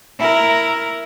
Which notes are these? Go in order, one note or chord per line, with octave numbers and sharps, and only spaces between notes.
E4 A#4